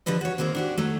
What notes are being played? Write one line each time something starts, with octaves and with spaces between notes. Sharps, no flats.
D3 F3 G3 B4 D#5
F#4 C#5
D#3 G#3 A#3 C4 D#4
D4 F#4 G4
D#3 F#3 A3